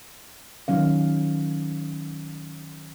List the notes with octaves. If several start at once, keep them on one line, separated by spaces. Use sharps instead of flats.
D#3 F#3 C#4 F5